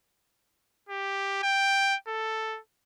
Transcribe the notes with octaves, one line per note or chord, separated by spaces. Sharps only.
G4
G5
A4